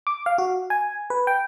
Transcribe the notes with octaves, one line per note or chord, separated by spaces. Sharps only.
D6
F5
F#4
G#5
B4
G5